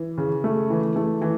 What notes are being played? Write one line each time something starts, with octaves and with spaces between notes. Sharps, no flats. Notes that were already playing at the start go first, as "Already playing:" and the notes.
Already playing: E3
C#3
A3
E3
A3
E3